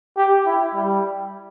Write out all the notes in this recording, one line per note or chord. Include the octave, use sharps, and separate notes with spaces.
G4
E4
G3